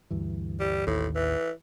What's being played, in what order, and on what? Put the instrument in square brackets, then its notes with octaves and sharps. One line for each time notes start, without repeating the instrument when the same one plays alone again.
[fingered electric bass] D2 G2 E3
[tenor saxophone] G3
[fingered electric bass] A1 D#2 [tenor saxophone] A2
[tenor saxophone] E3